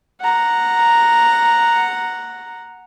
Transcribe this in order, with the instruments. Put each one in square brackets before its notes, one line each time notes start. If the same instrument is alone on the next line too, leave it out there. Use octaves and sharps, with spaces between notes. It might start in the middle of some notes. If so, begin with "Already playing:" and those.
[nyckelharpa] F#5 A#5